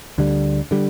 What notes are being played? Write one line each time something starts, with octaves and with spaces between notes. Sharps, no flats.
D2 D3 G3
D3 G3